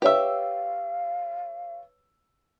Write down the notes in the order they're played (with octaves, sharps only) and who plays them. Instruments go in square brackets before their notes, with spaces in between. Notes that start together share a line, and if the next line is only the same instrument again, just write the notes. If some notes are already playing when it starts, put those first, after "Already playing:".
[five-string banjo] G4 E5 [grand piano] B4 C#5 E6 [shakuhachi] F5